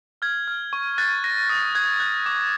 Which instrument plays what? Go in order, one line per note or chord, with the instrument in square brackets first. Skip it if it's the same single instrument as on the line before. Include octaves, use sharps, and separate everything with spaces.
[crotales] F6 G#6
F6
C#6
F#6 A6
F#6 A#6
D#6 A#6
F#6 G#6
F#6
D6